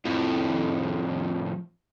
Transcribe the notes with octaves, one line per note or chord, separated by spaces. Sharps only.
F2 A2